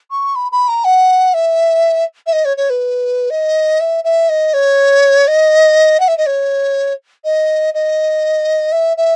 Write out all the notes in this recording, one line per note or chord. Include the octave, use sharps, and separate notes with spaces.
C#6
B5
B5
A#5
F#5
E5
E5
D#5
C#5
C#5
B4
D#5
E5
E5
D#5
C#5
D#5
F#5
E5
D#5
C#5
D#5
D#5
E5
E5